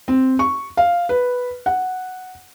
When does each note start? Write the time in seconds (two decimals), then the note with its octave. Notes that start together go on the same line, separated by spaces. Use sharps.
0.08 C4
0.39 C#6
0.77 F5
1.09 B4
1.66 F#5